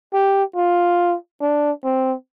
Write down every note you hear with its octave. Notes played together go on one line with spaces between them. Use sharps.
G4
F4
D4
C4